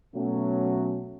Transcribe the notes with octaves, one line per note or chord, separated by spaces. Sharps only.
B2 F#3 A3 C#4